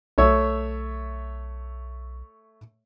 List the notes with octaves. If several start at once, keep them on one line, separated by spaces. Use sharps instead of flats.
B1 A3 C#5 E5